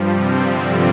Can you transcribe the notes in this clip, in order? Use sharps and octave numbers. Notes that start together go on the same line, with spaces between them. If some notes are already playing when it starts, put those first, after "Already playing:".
Already playing: G2 F3 G3
C3 C4
D3